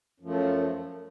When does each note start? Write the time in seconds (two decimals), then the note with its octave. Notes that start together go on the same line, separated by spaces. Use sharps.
0.20 F#2
0.23 F3
0.25 A3